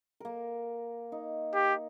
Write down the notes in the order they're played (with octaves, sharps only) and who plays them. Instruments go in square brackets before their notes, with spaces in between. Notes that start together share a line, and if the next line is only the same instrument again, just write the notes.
[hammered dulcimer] A#3 A#4
D#4
[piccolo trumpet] G4